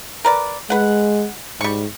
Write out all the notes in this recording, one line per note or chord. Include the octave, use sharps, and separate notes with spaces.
A#4 B4 D5
G#3 B4 F#5
G#2 G3 C#6